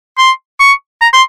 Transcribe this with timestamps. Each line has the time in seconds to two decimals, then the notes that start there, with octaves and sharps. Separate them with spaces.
0.18 C6
0.60 C#6
1.01 A#5
1.13 C6